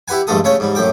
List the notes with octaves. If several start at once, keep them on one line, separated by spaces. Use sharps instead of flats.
E4 G4 B4 F#5 G#5
A#1 G2 G#3 A3 A4 D#6
C#3 A3 C#4 C#5
G#2 G3
F#2 A2 G5 D6